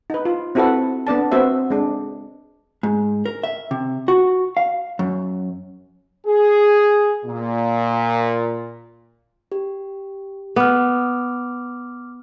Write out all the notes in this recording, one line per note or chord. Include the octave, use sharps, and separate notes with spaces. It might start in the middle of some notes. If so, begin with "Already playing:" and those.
D#4 B4
F4
C4 E4 F#4 A4 B4 F#5
B3 D4 D5 A5
B3 C4 F#4 C5 E5
G#3 D4
G#2
A#4
E5
C3
F#4
F5
F#2
G#4
A#2
G4
B3 D6 F6